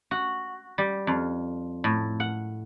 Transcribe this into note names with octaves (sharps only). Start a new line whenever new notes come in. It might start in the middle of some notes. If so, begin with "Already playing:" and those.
F#4
G3
F2
A2
F#5